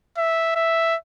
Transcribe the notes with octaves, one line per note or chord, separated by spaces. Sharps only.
E5
E5